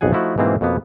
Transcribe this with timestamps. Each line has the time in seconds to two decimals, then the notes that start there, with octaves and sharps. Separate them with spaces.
0.01 B1 F2 G#4 F#5 G#5
0.12 F3 A3 D#4 E4 F#4
0.38 G#2 B2 E3 A#3 C4 G#4
0.61 F2 B2 A#3 B3